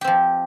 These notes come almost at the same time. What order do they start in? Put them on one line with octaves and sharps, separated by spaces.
G4 C4 F3